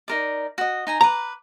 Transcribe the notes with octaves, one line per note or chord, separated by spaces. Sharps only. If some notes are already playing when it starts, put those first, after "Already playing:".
D#4 A#4 D5
F#4 D#5
D#4 G#5 A#5
B4 A#5 D6